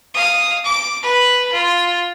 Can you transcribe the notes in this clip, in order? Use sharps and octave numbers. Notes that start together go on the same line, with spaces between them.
F5 D#6
D6
B4 B5
F4